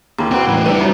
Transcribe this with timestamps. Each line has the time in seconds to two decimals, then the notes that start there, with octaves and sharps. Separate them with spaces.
0.18 D#2 D#3 G#3 A#3 E4 A#5
0.31 D#3 C4 F#4 B4 G5
0.48 E2 A2
0.66 G3 D4 E4 B4 C5 A5 E6 D#7
0.80 F#2 D#4 C#5